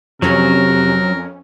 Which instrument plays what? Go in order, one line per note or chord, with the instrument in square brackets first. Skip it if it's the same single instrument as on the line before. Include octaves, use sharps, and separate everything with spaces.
[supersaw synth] F2 C#4 [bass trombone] C3 [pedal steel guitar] F#3 [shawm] A#4